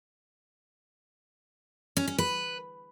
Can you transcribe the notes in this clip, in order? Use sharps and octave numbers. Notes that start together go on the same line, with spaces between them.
C#4
C#4
B4